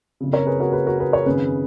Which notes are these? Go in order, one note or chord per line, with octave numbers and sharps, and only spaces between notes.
F#1 F2 C#3
A#4 C#5
G#4 B4
F#4 A#4
G#4 B4
F#4 A#4
G#4 B4
A#4 C#5
G#1 F#2 C#3 G#4 B4